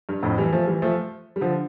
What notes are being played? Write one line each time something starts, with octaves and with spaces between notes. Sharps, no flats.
G2
F2 A2
E3 G3
F3 A3
E3 G3
F3 A3
G3
D3 F3